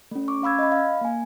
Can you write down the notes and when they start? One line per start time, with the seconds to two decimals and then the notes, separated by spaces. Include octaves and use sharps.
0.11 A3 C#4
0.28 C#6 D6
0.42 C#4 F5 B5 E6 G#6
0.59 D#5 B5
0.72 F5
1.01 A#3 G#5